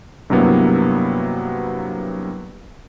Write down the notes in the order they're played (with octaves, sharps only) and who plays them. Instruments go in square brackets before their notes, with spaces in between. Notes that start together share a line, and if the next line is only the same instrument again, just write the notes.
[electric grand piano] G2 C3 F#3 A#3 B3 E4